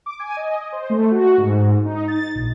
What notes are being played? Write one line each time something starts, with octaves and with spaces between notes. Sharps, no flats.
D6
G#5
D#5
C5
A3
F#4
G#2
D#4
A6
A#1